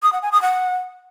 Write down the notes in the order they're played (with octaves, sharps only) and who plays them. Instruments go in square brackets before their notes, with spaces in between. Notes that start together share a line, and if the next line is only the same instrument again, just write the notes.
[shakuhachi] D#6
F#5
G#5
D#6
F#5